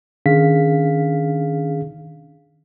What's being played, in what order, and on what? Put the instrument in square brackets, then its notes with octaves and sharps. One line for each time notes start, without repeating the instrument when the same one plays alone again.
[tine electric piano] D#3 C#4 D4 G#4 F5 B6